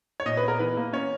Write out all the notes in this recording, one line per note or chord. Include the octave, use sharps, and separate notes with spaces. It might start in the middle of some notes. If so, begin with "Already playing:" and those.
C#5
A#2 D#5
B4
B3 A#4
E3 B4
A#3
C#4 C#5